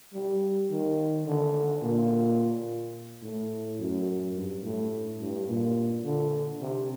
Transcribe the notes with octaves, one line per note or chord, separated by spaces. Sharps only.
G3
D#3
D3
A#2
A2
F#2
G2
A2
G2
A#2
D3
C3